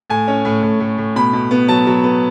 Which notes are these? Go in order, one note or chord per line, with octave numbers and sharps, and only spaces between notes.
A2 G#5
C#4
A2
A2
A2
A2
B2 B5
B2
B3
F#3 A5
F#3
B3